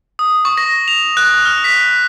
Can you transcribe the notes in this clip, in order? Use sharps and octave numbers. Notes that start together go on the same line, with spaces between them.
D#6
C#6
A#6
F7
F#6
F6
B6